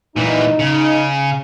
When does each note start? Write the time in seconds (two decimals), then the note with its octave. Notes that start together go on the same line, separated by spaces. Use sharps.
0.16 A#2 E3 D#4
0.59 C#3